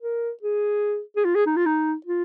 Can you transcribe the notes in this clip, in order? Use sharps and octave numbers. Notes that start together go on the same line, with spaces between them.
A#4
G#4
G#4
F4
G#4
D#4
F4
D#4
F4